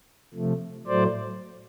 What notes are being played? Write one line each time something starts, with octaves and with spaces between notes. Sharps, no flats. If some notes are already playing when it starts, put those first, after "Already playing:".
C3 F3 A3
A2 F#3 A3 C5 D5